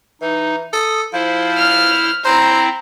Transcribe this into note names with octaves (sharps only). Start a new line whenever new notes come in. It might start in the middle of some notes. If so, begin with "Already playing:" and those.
E3 D#4
A4 D#6
F3 E4 C5
F6
C4 E4 C5 A#5